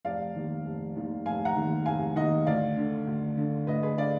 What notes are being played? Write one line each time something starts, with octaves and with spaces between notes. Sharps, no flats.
F1 D5 F5
D#2 D#3
F1
D#2 D#3
F1 F5 G#5
F#5 A#5
D#2 D#3
F1 F5 G#5
D#2 D#3 D#5 F#5
D2 D5 F5
D3
D2
D3
D2 B4 D#5
G#4 B4
D3 D5 F5